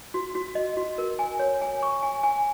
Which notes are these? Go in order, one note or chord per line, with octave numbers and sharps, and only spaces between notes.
F#4
F#4
D#5
F#4
A#4
G#5
C#5
G#5
C#6
G#5
G#5